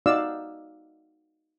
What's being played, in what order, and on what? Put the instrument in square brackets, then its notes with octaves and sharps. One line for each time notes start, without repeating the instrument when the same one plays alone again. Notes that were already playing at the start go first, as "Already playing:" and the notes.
[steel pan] D#4 F#4 D5 F5 E6